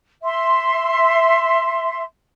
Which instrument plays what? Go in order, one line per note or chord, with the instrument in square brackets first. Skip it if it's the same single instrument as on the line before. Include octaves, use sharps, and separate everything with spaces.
[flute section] E5 C6